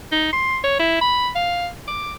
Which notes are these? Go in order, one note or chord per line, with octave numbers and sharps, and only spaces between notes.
D#4
C6
C#5
E4
B5
F5
D6